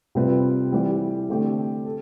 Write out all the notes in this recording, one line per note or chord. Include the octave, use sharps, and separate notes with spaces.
C3 G3 C4 F4 B4
E3 G3 C4 G4
D3 A3 C4 G4
A4